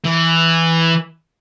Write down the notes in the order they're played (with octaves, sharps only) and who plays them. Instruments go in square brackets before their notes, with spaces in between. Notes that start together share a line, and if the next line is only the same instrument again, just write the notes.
[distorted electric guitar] E3